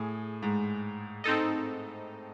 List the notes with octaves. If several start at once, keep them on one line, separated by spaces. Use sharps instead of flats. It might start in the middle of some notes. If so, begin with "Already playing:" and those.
Already playing: A2 G#4
G#2
C4 D#4 A4 D#5